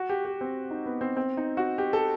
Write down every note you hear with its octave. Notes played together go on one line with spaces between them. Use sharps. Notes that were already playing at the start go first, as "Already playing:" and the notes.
Already playing: F#4
G4
G4
C4
D#4
B3
C4
C4
D#4
F#4
G4
A4